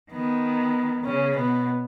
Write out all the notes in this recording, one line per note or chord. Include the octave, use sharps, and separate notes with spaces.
D#3 B3
C#3 C#4
B2 B3